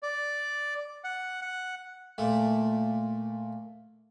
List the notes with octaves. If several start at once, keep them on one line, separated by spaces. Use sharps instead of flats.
D5
F#5
F#5
A#2 A3